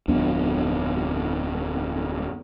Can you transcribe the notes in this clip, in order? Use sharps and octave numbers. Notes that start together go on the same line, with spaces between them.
D1 F2 B3 D4